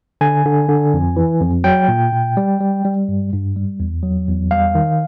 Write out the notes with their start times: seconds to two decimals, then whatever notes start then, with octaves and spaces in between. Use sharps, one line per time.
0.21 D3 G#5
0.45 D3
0.69 D3
0.94 F2
1.16 E3
1.41 F2
1.64 F#3 G5
1.88 A#2
2.12 A#2
2.37 G3
2.61 G3
2.85 G3
3.08 G2
3.33 G2
3.56 G3
3.80 E2
4.03 F#3
4.28 E2
4.51 G3 F5
4.75 D#3